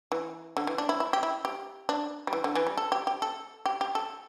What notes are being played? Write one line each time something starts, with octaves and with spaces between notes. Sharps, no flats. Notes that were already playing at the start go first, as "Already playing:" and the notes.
E3
D3
E3
D4
E4
E4
G4
E4
G4
D4
G3
E3
D3
E3
G3
A4
G4
G4
A4
G4
G4
A4